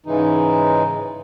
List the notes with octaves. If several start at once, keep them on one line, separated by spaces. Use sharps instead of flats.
G#2 C#3 E3 G#3 D#4